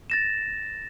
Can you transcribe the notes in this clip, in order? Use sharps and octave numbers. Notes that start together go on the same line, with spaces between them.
A6 A#6 E7